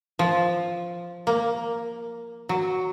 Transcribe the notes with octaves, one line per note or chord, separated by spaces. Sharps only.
F3
A#3
F#3